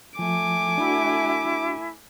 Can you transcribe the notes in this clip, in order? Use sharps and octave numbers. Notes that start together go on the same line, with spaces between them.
F3 A3 G#5 D6
D4 E4 F#4